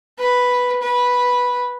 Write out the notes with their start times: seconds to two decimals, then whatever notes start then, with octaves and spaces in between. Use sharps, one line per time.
0.19 B4
0.82 B4